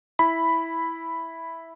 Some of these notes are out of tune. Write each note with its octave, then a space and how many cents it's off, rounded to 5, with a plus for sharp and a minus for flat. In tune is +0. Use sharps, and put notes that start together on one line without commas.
E4 -5 B5 +0